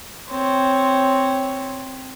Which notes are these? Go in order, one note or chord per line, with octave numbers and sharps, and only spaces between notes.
C4 C#5